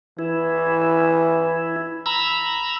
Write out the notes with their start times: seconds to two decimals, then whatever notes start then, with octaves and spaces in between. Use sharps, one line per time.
0.19 E3 E4
2.06 A#5 B5 E6